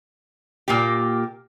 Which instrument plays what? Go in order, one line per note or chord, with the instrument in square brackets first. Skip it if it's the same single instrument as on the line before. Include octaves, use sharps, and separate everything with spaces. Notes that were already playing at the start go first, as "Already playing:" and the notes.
[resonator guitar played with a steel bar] A#2 A#3 G4